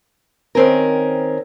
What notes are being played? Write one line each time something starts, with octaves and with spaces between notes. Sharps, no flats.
D#3 C4 C#4 A#4